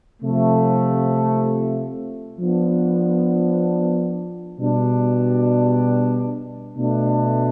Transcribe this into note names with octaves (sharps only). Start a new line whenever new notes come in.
C3 F3 A3
F3 B3 D4
B2 G3 D4
B2 A3 D4